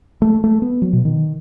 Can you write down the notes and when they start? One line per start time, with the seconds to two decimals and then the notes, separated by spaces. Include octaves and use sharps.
0.22 A3
0.44 A3
0.62 B3
0.82 F#3
0.93 B2
1.05 D#3